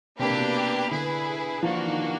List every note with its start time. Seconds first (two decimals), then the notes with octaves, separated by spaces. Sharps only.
0.18 C3 A#3 D4 G4 B4
0.30 C3
0.37 B2
0.91 D3 E4 G#4 B4
1.63 F3 A#3 D4 F#4
1.76 E3
1.87 D#3
2.00 E3